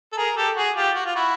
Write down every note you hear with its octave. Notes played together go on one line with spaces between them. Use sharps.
A4
G#4 A#4
G4 A4
F#4 G#4
F4 G4
F#4
F4
E4 F#4